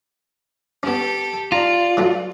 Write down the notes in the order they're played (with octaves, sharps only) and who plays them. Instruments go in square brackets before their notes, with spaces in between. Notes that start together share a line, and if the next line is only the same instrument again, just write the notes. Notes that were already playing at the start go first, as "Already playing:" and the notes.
[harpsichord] B3 C#4 [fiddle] G4 A4
[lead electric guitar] F4 [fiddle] D5 [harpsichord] A#5
[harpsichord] E3 F#3 A3